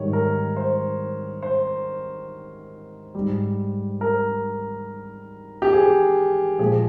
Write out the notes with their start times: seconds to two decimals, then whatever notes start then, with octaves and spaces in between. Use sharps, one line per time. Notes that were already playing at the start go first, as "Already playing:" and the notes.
Already playing: G#2 D#3 G3 C#5
0.13 A#4
0.57 C5
1.42 C5
3.15 G#2 G3
4.01 A#4
5.62 G4
5.73 G#4
6.59 A#2 F3 G#3 G#4